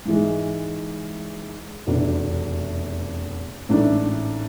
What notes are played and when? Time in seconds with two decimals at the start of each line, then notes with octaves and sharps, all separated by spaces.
0.05 G#2 E3 G#3
1.87 F1 E2 B2 B3 D4
3.69 A1 G#2 E3 A3 D4